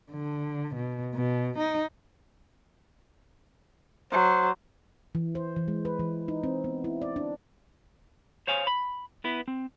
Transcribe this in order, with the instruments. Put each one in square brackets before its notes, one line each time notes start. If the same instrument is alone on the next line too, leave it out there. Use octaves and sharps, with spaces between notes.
[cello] D3
B2
B2
D#4
[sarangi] F#3 [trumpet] C5
[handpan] E3
C5
E3
G#3
B4
E3
D#4
C4
B3
E4
D5
D4
[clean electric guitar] C5 C#5 F5 G#5
B5
B3 E4 B4
C4